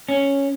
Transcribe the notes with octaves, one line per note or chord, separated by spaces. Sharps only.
C#4